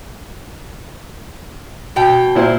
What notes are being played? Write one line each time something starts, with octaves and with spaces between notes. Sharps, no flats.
B2 G5
A#2 E4 C5